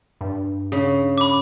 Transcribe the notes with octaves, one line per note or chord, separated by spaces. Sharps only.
G2
C#3
B5 D6